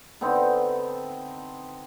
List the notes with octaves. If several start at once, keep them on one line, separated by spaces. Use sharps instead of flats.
D3 B3 C4 D#4